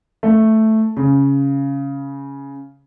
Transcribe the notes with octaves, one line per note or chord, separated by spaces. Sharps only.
A3
C#3